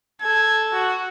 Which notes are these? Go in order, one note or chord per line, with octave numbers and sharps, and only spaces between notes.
A4 G#6
F#4